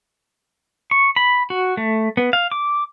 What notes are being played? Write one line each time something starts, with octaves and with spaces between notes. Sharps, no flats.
C#6
B5
F#4
A3
B3
F5
D6